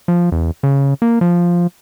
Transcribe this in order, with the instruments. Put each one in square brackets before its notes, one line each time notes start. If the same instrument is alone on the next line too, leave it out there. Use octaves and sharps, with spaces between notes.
[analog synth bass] F3
E2
C#3
A#3
F3